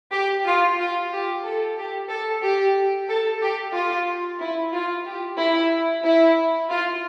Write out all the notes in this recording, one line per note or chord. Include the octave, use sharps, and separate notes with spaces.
G4
F4
F4
G4
A4
G4
A4
G4
A4
G4
F4
E4
F4
G4
E4
E4
F4